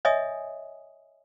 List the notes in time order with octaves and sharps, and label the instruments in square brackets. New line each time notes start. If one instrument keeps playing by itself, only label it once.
[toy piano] C#5 D#5 E5 G#5 D#6